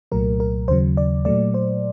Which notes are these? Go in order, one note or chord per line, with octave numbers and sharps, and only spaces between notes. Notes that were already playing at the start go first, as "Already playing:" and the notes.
C2 A#2 F#3 A3 A#4
A#4
D#2 C#3 F#3 C5
D5
A#2 F#3 A3 D5
C5